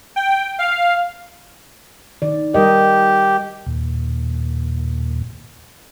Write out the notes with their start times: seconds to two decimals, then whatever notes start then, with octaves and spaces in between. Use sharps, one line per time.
0.16 G5
0.59 F5
2.22 D#3 D5
2.54 G3 G4 A#4 D#5
3.66 D#2 A#2